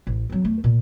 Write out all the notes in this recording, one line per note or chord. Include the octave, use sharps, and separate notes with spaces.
A1
F#3 C4
E2 A3
A#2